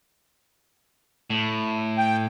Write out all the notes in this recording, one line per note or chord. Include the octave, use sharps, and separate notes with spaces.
A2
G5